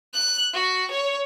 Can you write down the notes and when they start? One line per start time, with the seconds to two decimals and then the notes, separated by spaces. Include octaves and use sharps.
0.14 F#6
0.54 F#4
0.91 C#5